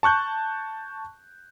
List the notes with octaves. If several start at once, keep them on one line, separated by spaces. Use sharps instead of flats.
A5 C#6 F#6 G6